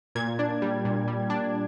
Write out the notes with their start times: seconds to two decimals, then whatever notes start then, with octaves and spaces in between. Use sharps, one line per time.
0.15 A#2 G#6
0.39 D4
0.62 G3
0.85 A#2
1.08 G3
1.30 D4